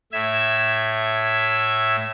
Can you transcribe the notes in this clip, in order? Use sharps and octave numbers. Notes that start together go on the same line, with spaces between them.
A2 E5 E6 G#6